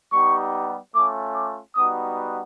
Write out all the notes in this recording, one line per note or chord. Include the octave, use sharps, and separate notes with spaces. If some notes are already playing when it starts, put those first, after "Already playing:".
G3 B3 D#4 G4 C#6
A3 C#4 F4 D6
D6
G3 B3 D#4 F#4 D#6